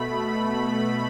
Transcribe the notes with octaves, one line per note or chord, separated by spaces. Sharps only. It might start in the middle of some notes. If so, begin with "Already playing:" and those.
Already playing: B2 A3 B5